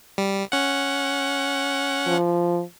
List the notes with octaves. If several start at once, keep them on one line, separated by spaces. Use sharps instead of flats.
G3
C#4 F#5
F3